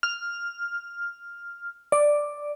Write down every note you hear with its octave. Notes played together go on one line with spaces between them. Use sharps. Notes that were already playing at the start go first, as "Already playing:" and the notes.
F6
D5